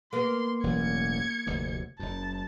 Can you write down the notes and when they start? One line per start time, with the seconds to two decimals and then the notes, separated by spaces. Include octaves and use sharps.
0.13 A#3 B3 C6
0.63 E1 A1 F#3 G#6 C#7
1.46 F1 D2 C3
1.99 F#1 F#2 A5